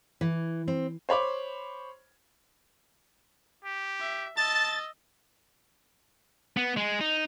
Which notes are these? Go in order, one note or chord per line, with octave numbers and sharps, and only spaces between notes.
E3
C4
C5 C#5 B5 D6
G4
E5
D#5 A5 E6 A6
B3
G#3
D#4